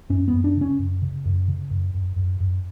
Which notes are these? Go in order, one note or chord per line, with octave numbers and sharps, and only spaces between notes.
F#2 C#4
B3
F#2
D4
C#3 C#4
F#2
C#3
F#2
C#3
F#2
F#2
F#2
F#2